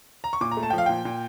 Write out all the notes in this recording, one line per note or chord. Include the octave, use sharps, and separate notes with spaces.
A#5
C#6
A#2 D6
A#5
A3
A5
F3 G5
F5
A#2 G5
A#2